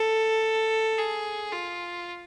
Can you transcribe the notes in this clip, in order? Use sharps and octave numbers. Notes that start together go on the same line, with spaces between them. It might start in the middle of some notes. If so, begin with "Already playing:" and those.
Already playing: A4
G#4
F4